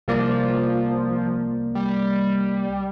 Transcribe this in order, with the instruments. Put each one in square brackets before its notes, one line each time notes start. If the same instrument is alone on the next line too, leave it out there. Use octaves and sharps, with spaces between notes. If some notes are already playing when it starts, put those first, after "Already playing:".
[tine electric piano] C2 A#3 D5 [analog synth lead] F3
[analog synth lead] G3